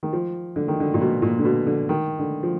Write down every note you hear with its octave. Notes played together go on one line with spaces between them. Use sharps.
D#3
F3
D3
D#3
D3
A#2
B2
A#2
D3
B2
D3
D#3
D3
F3